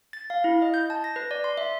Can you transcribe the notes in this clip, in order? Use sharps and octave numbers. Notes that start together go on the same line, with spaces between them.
A6
F5
E4
D#5
G6
A5
A#6
B4
D5
C6
E5